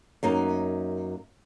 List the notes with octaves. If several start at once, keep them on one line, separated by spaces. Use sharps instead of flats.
F#2 A#3 D#4